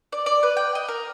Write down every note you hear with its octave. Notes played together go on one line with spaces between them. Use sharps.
D5
D5
B4
G5
D#5
A#4